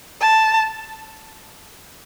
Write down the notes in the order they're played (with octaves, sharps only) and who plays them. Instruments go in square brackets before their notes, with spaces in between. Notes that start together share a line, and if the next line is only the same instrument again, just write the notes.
[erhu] A5